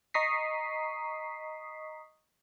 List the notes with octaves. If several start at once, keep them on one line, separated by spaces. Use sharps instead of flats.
D#5 A#5 C#6 D#6 B6 C7